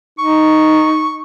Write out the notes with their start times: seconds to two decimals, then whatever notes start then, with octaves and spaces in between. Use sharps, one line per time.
0.19 D#4 C#6